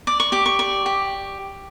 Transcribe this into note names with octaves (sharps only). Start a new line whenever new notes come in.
D5 D6
C#6
G4 D6
C#6
D5 C#6
G4